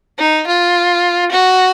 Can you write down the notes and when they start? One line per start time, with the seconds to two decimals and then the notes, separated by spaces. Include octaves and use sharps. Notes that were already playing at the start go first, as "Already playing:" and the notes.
0.18 D#4
0.47 F4
1.31 F#4